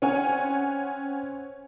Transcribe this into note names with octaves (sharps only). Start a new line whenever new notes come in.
C4 C#4 C#5 F#5 G#5